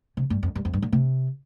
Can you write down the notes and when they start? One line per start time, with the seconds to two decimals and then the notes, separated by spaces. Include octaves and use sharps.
0.17 C3
0.30 G2
0.43 F2
0.55 G2
0.65 F2
0.73 G2
0.82 A#2
0.92 C3